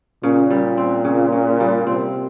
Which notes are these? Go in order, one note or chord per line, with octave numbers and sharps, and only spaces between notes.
A#2 C#3
G3
C4
C#3
C#3
G3
C3 C4